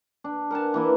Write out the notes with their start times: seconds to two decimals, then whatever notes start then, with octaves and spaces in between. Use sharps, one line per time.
0.24 D4
0.51 A#4 F#5 G#5 A5
0.74 E3 A#3 E4